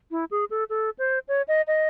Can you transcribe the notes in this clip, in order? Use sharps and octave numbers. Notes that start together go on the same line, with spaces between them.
E4
G#4
A4
A4
C5
C#5
D#5
D#5